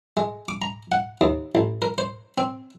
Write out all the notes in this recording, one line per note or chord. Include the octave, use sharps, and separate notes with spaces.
G#3
D6
A#5
F#5
D#2
A1
A#4
C5
C4